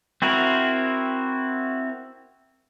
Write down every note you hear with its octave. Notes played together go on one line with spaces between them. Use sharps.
C4 E4 F#4 A#4